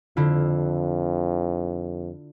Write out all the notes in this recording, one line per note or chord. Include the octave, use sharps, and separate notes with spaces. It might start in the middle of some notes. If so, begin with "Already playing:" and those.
F2 D3 E4 F4